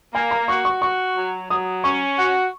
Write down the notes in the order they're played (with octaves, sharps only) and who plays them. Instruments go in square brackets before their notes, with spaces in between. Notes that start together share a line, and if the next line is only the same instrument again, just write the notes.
[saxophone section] A#3 [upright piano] G#5
[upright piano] A#5
[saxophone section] F#4 [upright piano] C#6
[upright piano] C#6
[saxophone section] F#4 [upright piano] C#6
[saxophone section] F#3
[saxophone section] F#3 [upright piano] D#6
[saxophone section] C#4 [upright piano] C#6
[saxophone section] F#4